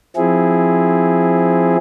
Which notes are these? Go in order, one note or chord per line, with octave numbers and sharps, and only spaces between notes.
F3 C4 E4 G#4